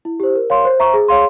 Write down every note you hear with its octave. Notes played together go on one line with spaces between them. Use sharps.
E4
G4 C5
A#4
C#5 F5 C6
C5
E5 A#5 C#6
G#4
C#5 F5 C6